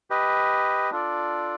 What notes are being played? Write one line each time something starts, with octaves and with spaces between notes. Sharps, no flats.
G4 B4 D#5
D4 F4 A4 D5